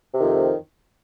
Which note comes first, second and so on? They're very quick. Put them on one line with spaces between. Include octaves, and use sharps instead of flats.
C3 D#3 F2